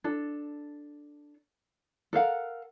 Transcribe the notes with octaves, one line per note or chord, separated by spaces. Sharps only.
D4 A4
A4 A#4 F5 F#5